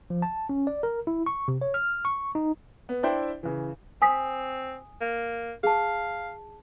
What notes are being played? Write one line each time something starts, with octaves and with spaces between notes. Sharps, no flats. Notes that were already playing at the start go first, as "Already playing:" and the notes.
F3
A5
C#4
D5
A#4
E4
C#6
C3
C#5
F6
C#6
D#4
B3
D4 E4 C5 E5 G5
C#3 E3
C4 G#5 D#6 B6
A#3
G#4 F5 A5